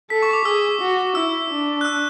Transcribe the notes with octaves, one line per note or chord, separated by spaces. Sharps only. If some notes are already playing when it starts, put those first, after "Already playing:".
A4 B6
C#6
D6
G#4 E6
F#4
E4 E6
D4
F#6
E6